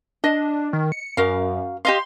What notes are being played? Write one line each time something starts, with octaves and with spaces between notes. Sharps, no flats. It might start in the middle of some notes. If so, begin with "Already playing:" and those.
D4 D#5
D#3
C#7
F#2 F#4 A#4 F5
G4 D#5 F5 C6